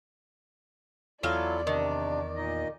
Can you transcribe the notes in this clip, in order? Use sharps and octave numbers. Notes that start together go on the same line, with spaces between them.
E2 F#3 E4 F4 A4 D5 F5
C3 D#3 D4
A#2 D#4 D#5